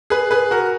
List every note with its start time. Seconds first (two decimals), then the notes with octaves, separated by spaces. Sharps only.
0.10 G#4 B4
0.31 G#4 B4
0.51 F#4 A#4